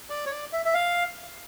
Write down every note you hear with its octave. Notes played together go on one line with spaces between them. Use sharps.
D5
C#5
D5
E5
E5
F5